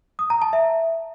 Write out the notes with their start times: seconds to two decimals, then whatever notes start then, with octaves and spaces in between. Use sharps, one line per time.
0.19 D#6
0.30 A#5
0.42 A5
0.53 E5